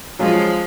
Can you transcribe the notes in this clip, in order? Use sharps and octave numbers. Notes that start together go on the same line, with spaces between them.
F3 F#3 G#3 C#4 F4 G#4